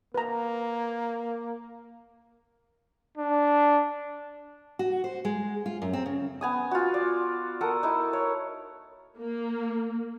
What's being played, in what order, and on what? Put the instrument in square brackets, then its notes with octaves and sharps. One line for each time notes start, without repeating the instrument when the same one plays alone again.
[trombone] A#3 [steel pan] B4 A#5
[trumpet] D4
[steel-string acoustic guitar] F#4
C5
G#3
F4
F#2
C4
C#3
[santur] B3 G#5 D#6
F4 F#4
D5
A4 A#4 F#5 D#6
D#4 E4
C#5
[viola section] A#3